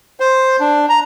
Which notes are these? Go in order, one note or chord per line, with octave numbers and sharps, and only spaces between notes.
C5
D4
A#5